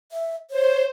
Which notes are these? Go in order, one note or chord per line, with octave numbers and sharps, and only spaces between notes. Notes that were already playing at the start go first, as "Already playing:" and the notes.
E5
C5 C#5